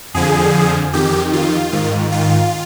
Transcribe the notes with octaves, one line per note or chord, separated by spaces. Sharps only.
F2 D3 F3 G#4
F2 D#3 G4
F4
G#2 D#3
F4